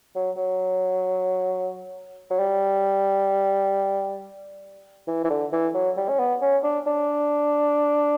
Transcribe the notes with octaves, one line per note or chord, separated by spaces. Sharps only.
F#3
F#3
F#3
G3
E3
E3
D3
E3
F#3
G3
C#4
B3
C#4
D4
D4